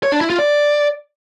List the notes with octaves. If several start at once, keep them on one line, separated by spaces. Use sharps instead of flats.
C#5
D4
E4
F4
D5